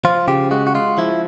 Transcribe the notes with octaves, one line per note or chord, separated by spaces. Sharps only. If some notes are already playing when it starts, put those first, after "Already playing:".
F3 F4
C#3 G4
G#3 F#4
F#4
G#3 F4
F3 E4